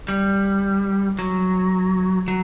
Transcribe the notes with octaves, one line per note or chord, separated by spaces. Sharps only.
G3
F#3
F#3